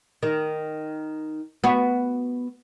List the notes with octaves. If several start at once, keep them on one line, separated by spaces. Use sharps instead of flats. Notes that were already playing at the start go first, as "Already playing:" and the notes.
D#3
B3 F#4